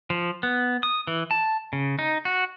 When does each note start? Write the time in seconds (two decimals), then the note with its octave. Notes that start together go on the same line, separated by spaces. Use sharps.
0.10 F3
0.43 B3
0.83 D#6
1.07 E3
1.31 A5
1.73 C#3
1.99 D#4
2.25 F#4